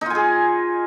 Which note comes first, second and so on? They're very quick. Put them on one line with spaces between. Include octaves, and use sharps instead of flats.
D#4 F4 G#5 G#4